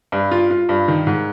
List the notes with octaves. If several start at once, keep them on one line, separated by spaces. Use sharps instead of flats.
G2
F4
F4
G2
D#3
G#2